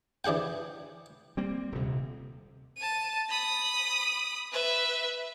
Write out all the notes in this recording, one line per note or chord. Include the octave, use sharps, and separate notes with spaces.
E3 D4 G#4 F#5 G5
G3 A#3 C4
D#1 D2 C3
A5 D#7
B5 D#6
B4 E5